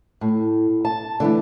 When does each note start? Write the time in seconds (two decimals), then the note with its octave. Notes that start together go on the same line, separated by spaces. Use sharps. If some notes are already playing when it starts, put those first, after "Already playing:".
0.21 A2
0.85 A5
1.20 D3 E3 A3